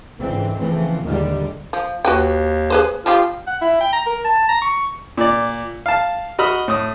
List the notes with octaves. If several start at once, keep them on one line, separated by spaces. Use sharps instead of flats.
C#2 G#2 D3 E3 C4
C#3 E3 F3 A3 C4
D#2 A#2 D3 D#3 G3 G#3
F3
D#2 F#4 B4 G5
G#4 B4 C5
F3 G3 F4 G4
F#5
E4
G5
A#5
A#4
A5
A#5
C#6
A#2 D5
F5 A5
F#4 D#5 B5 D#6 F6
A2 D#6